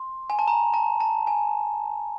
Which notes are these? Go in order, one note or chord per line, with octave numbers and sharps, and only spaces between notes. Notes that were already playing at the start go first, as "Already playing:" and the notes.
Already playing: C6
G#5
A5
A#5
A5
A5
G#5